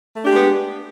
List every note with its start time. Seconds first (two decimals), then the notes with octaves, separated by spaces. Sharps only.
0.16 A3
0.21 D4
0.26 G4
0.30 G#3
0.35 B3